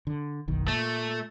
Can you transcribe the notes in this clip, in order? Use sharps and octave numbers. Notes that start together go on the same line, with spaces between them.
D3
F#1 B1 D#3
A#2 A3